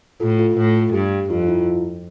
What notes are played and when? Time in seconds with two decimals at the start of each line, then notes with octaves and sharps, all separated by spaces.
0.20 A2 F4 A4
0.39 F4 A4
0.57 A2 F4 A4
0.93 G2 G4
1.30 F2 F4
1.43 F4
1.48 E4